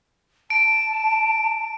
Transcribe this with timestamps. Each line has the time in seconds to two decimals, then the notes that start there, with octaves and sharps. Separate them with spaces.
0.50 A5 D7